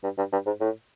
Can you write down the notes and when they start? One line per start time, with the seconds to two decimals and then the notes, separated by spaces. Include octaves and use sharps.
0.04 G2
0.18 G2
0.32 G2
0.46 G#2
0.61 A2